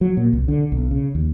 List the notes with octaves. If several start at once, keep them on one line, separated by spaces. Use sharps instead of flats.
F#3
A#2
C2
D3
B1
C#3
D#2